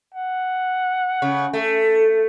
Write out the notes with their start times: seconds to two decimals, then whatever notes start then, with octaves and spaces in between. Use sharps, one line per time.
0.14 F#5
1.22 C#3
1.53 A3